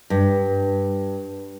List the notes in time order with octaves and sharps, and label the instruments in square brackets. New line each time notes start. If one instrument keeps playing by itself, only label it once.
[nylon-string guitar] G2